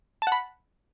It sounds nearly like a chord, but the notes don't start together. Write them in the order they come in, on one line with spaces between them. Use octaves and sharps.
A5 F#5 B5